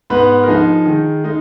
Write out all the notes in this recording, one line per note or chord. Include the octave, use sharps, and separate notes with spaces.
G#2 B3 B4
A#4
F3 G#3 D#4 G#4
D#3
G#3 D#4